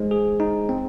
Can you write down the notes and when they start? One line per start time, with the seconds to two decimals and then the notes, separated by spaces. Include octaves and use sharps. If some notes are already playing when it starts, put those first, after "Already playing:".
Already playing: G#3 D#4 G#4 C5
0.11 G#4
0.40 D#4
0.69 C4